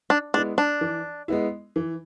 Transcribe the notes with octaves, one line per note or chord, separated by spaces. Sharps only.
D4
G#3 B3 D4 E4
D4
E3
G#3 B3 E4
E3